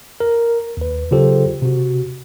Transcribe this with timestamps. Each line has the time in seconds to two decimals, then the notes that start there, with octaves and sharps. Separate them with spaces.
0.20 A#4
0.77 D#2 B4
1.11 C#3 F#3 F4 G4 A4 C5
1.62 C3 F#4